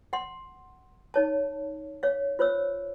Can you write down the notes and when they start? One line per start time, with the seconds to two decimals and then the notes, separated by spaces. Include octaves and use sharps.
0.13 F#5 C6
1.14 D#4 C#5 A5
2.03 C#5 F5
2.39 F4 C5 C#5 E6